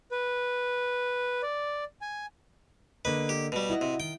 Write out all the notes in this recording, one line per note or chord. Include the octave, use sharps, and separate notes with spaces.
B4
D5
G#5
D3 A#3 B4 D#5
G4
B2 G3
E4 F#4 D#5
C3
D#3 G5